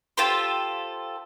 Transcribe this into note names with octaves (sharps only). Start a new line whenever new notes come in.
F4 G4 A4 C5